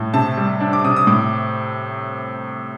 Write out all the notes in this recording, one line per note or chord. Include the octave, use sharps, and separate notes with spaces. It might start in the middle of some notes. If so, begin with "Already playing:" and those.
Already playing: A2
C3 A5
G3
D4
D6
C3 D#6
D#6
A2 D6